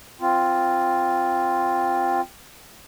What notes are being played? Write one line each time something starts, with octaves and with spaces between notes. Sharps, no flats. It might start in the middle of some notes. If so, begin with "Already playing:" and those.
C4 F4